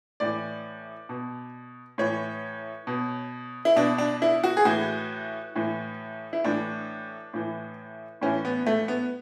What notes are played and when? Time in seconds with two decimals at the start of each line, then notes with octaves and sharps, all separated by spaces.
0.20 A2 E3 D5
1.09 B2
1.98 A2 E3 C#5
2.87 B2
3.65 E4
3.76 B2 D4
3.98 D4
4.22 E4
4.44 F#4
4.57 G#4
4.65 A2 E3 F#4
5.55 A2 E3
6.33 E4
6.44 A2 E3 D4
7.34 A2 E3
8.21 A2 E3 C#4
8.45 B3
8.66 A3
8.88 B3